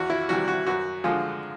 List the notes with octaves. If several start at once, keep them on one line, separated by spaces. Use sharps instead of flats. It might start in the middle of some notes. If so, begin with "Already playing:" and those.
Already playing: E2 F#4
E4
C3 E3 G3 F#4
F#4
F#2 F#4
D3 F3 G#3 F4